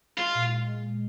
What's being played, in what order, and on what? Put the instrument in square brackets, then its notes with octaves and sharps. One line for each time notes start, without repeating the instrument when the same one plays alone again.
[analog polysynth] G#3 [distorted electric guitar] F4
[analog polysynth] A#2
A#2
G#3
A#2